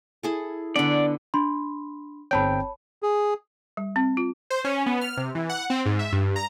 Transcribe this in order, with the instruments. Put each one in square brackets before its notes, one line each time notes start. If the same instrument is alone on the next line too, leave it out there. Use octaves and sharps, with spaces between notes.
[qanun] E4 G#4 A4
[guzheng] D3 B3 [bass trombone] D4 [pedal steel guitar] D5
[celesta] D4 B5 C6
[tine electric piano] G1 C4 G5 [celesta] C#5 A5 B5
[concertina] G#4
[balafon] G3
C4
F4
[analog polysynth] C5
C#4
B3
F6
C3
E3
F#5
C4
G#2
E5
G2
A#5